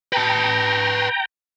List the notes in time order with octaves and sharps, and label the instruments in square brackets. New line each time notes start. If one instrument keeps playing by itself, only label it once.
[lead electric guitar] B4 A5 [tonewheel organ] G5 A#5